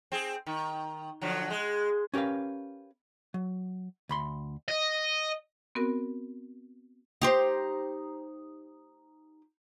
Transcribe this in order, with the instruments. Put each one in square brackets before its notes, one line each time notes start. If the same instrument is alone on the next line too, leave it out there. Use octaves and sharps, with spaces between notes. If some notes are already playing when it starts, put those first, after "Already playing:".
[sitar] C4 G#4
D#3
D3 F3 F#3
G#3
[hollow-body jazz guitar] C#4 G4 A#4 B4 F5
F#3
D2 B5 C6
[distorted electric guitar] D#5
[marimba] B3 C4 F#4 A#4
[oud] D#4 G4 C5